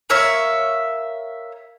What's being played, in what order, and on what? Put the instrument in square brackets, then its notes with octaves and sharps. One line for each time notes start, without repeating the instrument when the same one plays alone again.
[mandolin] A#4 C#5 E5 F5